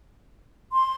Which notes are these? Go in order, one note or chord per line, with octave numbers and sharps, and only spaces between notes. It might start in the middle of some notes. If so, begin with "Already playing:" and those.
C6